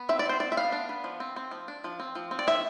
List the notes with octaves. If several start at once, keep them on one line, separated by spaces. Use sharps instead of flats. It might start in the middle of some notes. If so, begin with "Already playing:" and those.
Already playing: B3
C4 E5
D5
C4 C5
C4 D5
E5
B3 F5
D4
B3
F3
C4
C4
F3
D4
F3
C4
F3
C4
D5
F3 E5